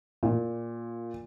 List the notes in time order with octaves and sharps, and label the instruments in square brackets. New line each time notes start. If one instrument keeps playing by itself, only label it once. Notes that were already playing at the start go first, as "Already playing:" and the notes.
[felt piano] A#2